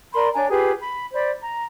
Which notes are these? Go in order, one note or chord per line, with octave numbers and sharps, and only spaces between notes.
A#4 D5 B5 C6
D4 C#5 G#5 A#5
F4 G4 G#4 B4
B5
C5 D5 B5
A#5